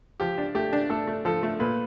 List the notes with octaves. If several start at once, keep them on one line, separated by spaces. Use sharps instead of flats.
F3 G4
D4
A3 G4
D4
A3 A4
A3
F3 A4
A3
A#2 B4